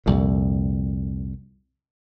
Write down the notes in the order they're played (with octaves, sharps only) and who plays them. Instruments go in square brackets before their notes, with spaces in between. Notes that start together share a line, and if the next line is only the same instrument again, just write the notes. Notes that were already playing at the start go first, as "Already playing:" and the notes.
[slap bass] C2 F2 A#2